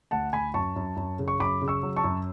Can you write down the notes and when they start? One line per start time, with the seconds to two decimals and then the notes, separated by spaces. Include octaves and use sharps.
0.11 D2 F#5 A5
0.33 D2 G#5 B5
0.54 F#2 A5 C#6
0.76 F#2
0.96 F#2
1.19 C#3
1.28 C#6
1.39 F#2 B5 D6
1.62 C#3
1.68 C#6 E6
1.83 F#3
1.96 A5 C#6
2.04 F#2